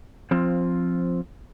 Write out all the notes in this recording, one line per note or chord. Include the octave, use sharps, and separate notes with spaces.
F3 C4 F4